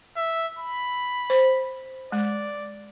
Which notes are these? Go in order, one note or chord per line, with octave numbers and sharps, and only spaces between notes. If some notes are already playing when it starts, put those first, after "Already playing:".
E5
B5
C5
G#3 D5